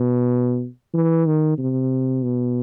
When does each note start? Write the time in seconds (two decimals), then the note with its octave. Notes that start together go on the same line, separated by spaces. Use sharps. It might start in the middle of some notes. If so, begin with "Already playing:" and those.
Already playing: B2
0.94 E3
1.26 D#3
1.58 C3
2.23 B2